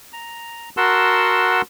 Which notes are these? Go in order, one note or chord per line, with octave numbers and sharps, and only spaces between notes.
A#5
F#4 A#4 F#5 A5 C6 E6